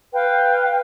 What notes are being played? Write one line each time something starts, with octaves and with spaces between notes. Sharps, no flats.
B4 F5 G5